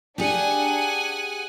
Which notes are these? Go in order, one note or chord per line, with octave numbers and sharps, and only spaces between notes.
D4 G4 G#4 F#5 G#5